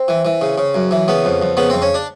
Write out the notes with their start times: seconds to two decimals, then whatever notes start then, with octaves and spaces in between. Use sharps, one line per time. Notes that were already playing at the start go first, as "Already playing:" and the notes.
Already playing: C4
0.08 E3
0.25 E3
0.41 C#3
0.58 C#3
0.75 F#2
0.91 E3
1.08 C#3 B3
1.25 F2
1.41 F2
1.57 C#3 B3
1.70 F2 C4
1.82 C#4
1.94 D4